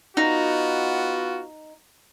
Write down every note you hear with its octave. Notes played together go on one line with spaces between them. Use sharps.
B3 D#4 F4 F#4